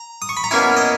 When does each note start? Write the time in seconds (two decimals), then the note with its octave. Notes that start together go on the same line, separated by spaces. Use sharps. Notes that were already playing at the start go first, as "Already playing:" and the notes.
Already playing: A#5
0.22 D#6
0.29 C#6
0.37 B5
0.44 A#5
0.51 B2 A#3 C#4 E4 G#5
0.77 D#5